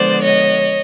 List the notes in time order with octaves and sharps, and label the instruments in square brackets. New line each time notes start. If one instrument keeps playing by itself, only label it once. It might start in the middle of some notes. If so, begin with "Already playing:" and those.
Already playing: [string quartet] D3 F3 G#3 B3 C5 D5
C#5 D#5